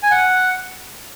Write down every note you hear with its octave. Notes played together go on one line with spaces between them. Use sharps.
G#5
F#5